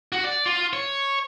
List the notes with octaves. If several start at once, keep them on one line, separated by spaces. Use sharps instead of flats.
F#4
D5
F4
C#5